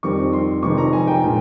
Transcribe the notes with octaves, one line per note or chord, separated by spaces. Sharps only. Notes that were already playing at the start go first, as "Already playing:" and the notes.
F2 D#3 G3 C4 C#6
C6
F1 F2 D#3 G#3 C#6
A#5
G#5
G5
A#2 F3 G#3